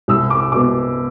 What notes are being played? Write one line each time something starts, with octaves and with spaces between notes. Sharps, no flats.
C2 E6
D6
B2 B3 D6